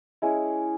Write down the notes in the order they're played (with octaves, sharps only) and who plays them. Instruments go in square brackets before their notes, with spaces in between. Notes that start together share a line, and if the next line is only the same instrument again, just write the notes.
[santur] G#3 C#4 E4 G#4